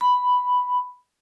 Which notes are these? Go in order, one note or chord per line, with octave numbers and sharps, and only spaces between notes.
B5